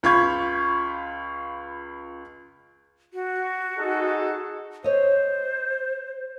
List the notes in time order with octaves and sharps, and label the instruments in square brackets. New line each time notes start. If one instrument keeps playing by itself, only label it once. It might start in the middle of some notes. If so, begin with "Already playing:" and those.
[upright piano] C#2 F4 B5 C#6 G6 G#6
[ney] F#4
[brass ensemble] D#4 G#4 A4
[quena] C5 [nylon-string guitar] C#5 D#5